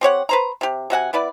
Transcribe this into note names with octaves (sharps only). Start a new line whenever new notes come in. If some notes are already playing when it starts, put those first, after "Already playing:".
C4 G4 C#5 F#5
B4 C5 A#5
C3 G4
C3 F#4 F#5 G#5
B3 E4 B4 D5